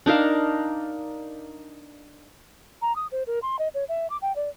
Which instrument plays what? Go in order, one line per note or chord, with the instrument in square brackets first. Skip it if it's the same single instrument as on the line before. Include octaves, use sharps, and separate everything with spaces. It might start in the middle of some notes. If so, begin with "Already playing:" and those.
[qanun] D4 D#4 A#4 F5
[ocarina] A#5
D#6
C5
A#4
C6
D#5
C#5
E5
D6
G5
D5